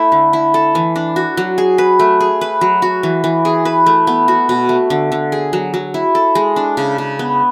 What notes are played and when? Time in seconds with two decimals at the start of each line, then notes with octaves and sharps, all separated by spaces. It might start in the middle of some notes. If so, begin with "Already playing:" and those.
Already playing: A3 E4
0.12 D3
0.33 E4
0.54 A4
0.75 E3
0.96 D4
1.16 F#4
1.37 F#3
1.58 G#4
1.78 B4
1.99 A3
2.20 G#4
2.41 B4
2.61 F#3
2.82 F#4
3.03 E3
3.24 E3
3.45 G#4
3.65 B4
3.86 A3
4.07 B3
4.28 F#4
4.49 B2
4.69 A3
4.90 D3
5.12 D3
5.32 G#4
5.53 F#3
5.74 F#3
5.94 E4
6.15 A4
6.35 G#3
6.56 D4
6.77 C#3
6.98 C#3
7.19 B3